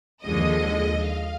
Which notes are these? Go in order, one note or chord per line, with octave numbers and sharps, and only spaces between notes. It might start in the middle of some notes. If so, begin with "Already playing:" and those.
D#2 D3 F3 G#3 D#5
F5